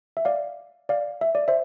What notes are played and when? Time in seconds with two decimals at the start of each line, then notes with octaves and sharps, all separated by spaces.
0.17 E5
0.25 D5 F5
0.89 D5 F5
1.21 E5
1.35 D5
1.48 C5 E5